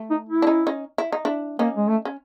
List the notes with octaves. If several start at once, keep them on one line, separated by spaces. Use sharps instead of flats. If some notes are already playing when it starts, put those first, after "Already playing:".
Already playing: A3
D#4
E4
D4
C#4 D#4
C#4 D#4
E4
D#4
D4 E4
A#3 C#4 D#4
G#3
A3
C#4